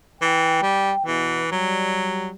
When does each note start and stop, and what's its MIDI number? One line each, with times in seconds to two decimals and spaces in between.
0.22 0.61 52
0.22 1.05 79
0.63 0.92 55
1.06 1.42 40
1.06 1.42 47
1.06 1.50 52
1.52 2.30 54
1.52 2.35 55